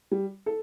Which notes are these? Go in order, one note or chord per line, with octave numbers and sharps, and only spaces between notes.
G3
A4